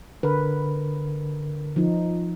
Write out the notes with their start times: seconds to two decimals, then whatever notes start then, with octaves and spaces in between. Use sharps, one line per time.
0.23 D3 A#4 B4
1.76 F3 D#4